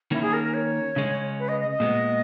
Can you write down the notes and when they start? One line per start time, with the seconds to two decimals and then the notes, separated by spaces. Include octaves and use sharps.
0.11 D#3 A#3 C#4 E4
0.22 G#4
0.33 A#4
0.44 A#4
0.54 C#5
0.96 C#3 G#3 C#4
1.39 B4
1.48 D#5
1.60 D#5
1.71 D#5
1.80 A#2 G#3 B3